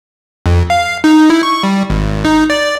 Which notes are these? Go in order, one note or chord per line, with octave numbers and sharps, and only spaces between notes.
F2
F5
D#4
E4
C#6
G3
G#1
D#4
D5